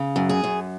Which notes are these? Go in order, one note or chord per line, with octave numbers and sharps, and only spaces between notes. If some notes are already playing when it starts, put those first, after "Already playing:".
Already playing: C#3
F#2
G#4
F#2